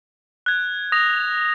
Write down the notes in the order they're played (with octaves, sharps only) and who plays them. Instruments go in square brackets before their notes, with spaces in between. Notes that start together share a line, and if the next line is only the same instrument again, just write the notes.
[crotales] F#6 G#6
D#6 A#6 F7